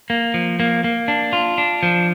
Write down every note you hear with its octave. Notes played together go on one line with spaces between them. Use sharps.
A#3
F3
A#3
A#3
D4
F4
D4
F3